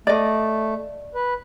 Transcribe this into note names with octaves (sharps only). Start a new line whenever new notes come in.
A3 D5 D#5
B4